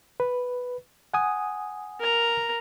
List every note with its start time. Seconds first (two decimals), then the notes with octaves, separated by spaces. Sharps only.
0.20 B4
1.14 F#5 G#5 D#6
2.00 A#4 A#5